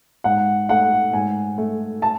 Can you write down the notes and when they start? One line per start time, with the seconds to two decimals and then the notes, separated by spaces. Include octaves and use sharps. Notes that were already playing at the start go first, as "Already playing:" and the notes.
0.24 G#2 F#5
0.69 A3 F#5
1.13 G#2 G#5
1.58 A3
2.02 A5